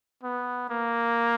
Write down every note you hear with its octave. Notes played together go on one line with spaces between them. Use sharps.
B3
A#3